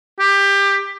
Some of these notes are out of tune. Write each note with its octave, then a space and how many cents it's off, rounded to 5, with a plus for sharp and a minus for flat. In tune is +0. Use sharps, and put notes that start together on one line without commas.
G4 +20